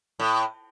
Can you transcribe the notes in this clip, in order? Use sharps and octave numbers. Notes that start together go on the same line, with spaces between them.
A2